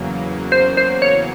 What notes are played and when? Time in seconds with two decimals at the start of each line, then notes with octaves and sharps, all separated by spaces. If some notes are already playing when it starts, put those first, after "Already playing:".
Already playing: E2 C#3 F#3 A#3
0.52 C5
0.77 C5
1.02 C#5